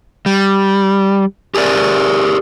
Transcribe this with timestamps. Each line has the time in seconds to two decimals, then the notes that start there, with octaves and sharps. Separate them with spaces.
0.26 G3
1.55 G4 G#4 A#4 D5